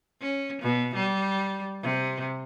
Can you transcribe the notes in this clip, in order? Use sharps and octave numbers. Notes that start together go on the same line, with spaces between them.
C#4
B2
G3
C3